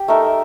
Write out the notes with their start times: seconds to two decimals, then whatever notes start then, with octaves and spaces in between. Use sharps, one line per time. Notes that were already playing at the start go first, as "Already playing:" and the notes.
Already playing: G4
0.08 A3 D#4 A#4